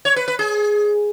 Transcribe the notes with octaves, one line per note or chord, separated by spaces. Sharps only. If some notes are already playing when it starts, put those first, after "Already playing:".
C#5
B4
B4
G#4